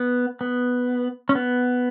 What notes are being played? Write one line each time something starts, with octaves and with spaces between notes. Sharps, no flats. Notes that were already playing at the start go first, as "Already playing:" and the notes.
Already playing: B3
B3
C#4
B3